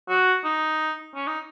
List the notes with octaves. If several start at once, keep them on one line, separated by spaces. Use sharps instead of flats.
F#4
D#4
C#4
D#4